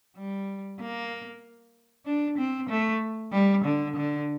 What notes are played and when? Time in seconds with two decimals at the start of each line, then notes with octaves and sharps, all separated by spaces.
0.17 G3
0.81 A#3
2.06 D4
2.38 C4
2.70 A3
3.32 G3
3.65 D3
3.97 D3